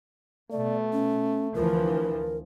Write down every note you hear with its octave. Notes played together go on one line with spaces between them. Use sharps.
B2 A3 D5
C#4
D2 E3 F3 A#4